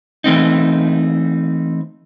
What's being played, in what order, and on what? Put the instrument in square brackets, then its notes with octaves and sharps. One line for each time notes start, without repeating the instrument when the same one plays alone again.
[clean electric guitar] E3 A3 C4 D#4